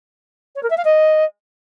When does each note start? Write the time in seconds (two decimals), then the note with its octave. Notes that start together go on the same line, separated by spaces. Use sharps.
0.55 C#5
0.63 A#4
0.70 E5
0.77 F5
0.84 D#5